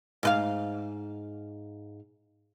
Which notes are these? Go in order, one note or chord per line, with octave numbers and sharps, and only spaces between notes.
G#2 B4 F5